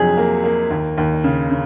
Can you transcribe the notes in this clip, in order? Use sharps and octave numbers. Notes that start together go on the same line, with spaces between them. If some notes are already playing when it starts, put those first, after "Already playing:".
Already playing: F2 C3 F#3 G#4
A#3
A#3
D#2
D#2
C#3
C#3